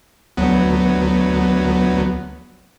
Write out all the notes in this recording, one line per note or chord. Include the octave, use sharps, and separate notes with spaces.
D2 F#3 B3